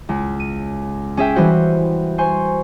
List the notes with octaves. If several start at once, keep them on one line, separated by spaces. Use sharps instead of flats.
C#2
D#7
C#4 G#4 E5 G5
E3 G3 F#4 C5
C5 G#5 C6 C#6